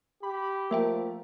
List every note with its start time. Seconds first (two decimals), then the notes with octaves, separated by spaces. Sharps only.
0.23 G4 B5
0.71 F3 A3 A#3 A#4 E5 G5